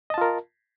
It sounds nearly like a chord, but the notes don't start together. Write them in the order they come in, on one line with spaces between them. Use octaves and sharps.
D#5 A5 F4 A#4